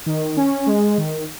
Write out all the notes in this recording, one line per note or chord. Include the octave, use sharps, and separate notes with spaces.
D#3
C#4
G#3
D#3